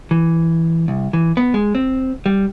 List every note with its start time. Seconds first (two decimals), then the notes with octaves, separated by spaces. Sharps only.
0.11 E3
0.88 C2
1.13 E3
1.37 B3
1.54 G#3
1.75 C4
2.26 G3